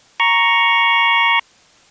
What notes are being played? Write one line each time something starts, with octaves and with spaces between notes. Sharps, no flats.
A#5 C#6